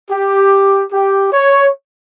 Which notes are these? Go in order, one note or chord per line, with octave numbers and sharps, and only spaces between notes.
G4
G4
C#5